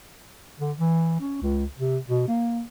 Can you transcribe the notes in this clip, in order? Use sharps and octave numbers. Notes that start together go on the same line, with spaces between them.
D3
E3
C#4
C#2
C3
B2
A#3